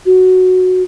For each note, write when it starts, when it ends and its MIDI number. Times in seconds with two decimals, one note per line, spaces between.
0.06 0.83 66